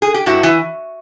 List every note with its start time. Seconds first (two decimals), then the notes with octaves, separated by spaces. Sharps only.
0.02 G#4
0.14 G4
0.26 G2 E4 F#4
0.43 E3